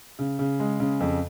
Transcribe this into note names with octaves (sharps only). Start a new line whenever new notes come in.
C#3
C#3
G#3
C#3
F2